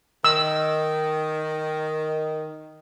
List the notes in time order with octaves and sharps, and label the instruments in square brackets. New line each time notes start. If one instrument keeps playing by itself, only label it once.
[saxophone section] D#3 [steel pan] E6